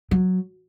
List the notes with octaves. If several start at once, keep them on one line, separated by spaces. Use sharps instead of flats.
F#3